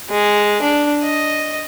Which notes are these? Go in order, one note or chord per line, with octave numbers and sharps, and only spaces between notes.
G#3
D4
D#5